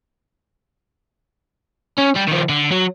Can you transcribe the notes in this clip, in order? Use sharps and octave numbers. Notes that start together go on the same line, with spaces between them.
C#4
G3
D#3 F3
D3
F#3